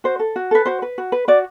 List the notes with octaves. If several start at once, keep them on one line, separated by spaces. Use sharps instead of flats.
F#4 C5
A4
F#4
A4 B4
F#4 C5
B4
F#4
B4
F#4 D5